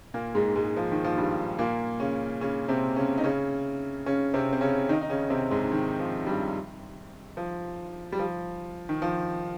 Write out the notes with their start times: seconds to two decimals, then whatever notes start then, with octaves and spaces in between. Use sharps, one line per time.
0.14 A#2 A#3
0.35 G#2 G#3
0.55 G#2 G#3
0.77 F3
0.92 D#3
1.04 F3
1.17 G2 G3
1.59 A#2 A#3
2.00 C#3 C#4
2.41 C#3 C#4
2.69 C3 C4
2.96 C#3 C#4
3.18 D#4
3.24 C#3 C#4
4.06 C#3 C#4
4.34 C3 C4
4.53 C4
4.61 C#3 C#4
4.89 D#3 D#4
5.01 D#4
5.10 C#3 C#4
5.30 C3 C4
5.51 G#2 G#3
5.72 D#3
5.99 F3
6.27 G2 G3
7.37 F3
8.12 G3
8.19 F3
8.89 D#3
9.02 F3